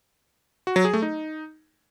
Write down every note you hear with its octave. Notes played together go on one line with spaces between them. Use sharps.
F#4
F#3
G#4
A3
D#4